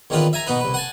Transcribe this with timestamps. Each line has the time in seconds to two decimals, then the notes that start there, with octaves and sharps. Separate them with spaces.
0.10 E2 D#3 C4 D4 F4 B4
0.33 E5 G#5 A#5
0.47 B2 B3 D#4 B4
0.60 C2 B4
0.74 F#5 G#5 A5